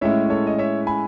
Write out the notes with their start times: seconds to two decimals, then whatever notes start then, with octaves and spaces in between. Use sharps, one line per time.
0.01 A2 G#3 C#4 E4 C#5 E5
0.30 A4 C#5
0.47 D#5
0.58 C#5 E5
0.87 G#5 B5